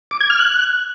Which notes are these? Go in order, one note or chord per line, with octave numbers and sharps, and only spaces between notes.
D6
G#6
F6
F#6